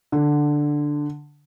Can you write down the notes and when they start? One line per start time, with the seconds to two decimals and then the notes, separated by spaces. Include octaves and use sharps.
0.12 D3